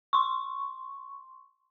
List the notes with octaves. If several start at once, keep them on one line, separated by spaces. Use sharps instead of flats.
C6 C#6